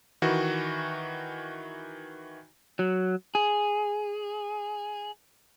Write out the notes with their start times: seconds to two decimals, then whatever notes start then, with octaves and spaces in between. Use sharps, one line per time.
0.22 D#3 E3 F#4
2.79 F#3
3.35 G#4